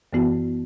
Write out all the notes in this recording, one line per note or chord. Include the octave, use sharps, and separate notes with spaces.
F#2 E3 B3 F#4